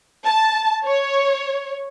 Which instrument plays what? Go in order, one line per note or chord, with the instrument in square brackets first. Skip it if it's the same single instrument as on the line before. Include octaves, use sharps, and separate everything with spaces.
[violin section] A5
C#5